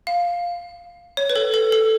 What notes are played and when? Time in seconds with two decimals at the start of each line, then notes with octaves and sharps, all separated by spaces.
0.07 F5
1.17 C#5
1.30 B4
1.36 A4
1.54 A4
1.72 A4